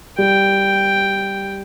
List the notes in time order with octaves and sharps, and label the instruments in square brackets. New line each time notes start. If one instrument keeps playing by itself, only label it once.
[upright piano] G3 [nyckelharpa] G5